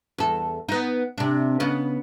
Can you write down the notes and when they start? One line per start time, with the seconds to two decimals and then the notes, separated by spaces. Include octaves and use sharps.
0.18 E2 A4
0.69 B3 D#4
1.18 C3 D4
1.60 C#3 B3 D#5